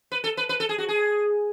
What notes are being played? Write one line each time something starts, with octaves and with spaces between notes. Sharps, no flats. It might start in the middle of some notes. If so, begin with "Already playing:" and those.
B4
A4
B4
B4
A4
G#4
F#4
G#4